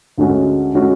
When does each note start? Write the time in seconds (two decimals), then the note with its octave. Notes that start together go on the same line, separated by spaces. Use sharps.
0.18 D2 D3 G#3 C#4 F#4
0.74 D3 G#3 C#4 F#4